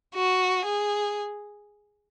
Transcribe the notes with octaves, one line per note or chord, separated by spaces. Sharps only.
F#4
G#4